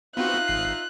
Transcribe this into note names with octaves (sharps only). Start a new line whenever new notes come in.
B3 C4 D#4 F4 F#4 E5 F#6
G#1 C7